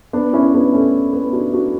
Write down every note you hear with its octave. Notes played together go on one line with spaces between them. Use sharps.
B3 D4
C#4 E4
B3 D4
A3 C#4
B3
D4 F#4
D4 F#4